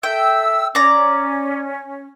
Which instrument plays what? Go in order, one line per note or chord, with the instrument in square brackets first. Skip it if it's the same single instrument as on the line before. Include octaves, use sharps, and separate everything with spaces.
[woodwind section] A4 E5 E6 [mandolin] G5
[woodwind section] C#4 [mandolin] D5 A#5